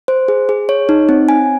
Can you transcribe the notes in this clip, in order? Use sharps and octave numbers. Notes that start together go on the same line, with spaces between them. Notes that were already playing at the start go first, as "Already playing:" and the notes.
C5
G#4
G#4
C#5
D#4
C4
G#5